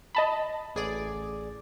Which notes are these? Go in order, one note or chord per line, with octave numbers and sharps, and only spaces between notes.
D#5 A5 B5
A1 G#4 D5